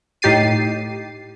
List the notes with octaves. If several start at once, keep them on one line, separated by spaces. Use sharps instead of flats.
A2 D#4 G4 A6 C7 D#7